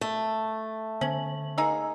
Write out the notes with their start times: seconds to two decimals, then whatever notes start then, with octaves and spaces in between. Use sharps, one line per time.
0.01 A3
1.01 D3 C#4 C5 F#7
1.58 A#3 D#4 G#4 E6